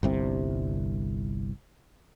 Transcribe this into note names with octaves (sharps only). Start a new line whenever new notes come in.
G1 C2 C3